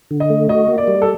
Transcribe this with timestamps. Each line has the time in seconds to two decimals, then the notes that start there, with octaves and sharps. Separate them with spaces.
0.11 D3
0.20 D#5
0.30 A3
0.49 F#4 D#5
0.68 A#3
0.78 D5
0.87 G3
1.02 A4